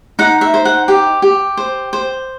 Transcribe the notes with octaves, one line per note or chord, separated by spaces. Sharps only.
D#4 F#5
E5
C5
F#5
G4 G5
G4
C5
C5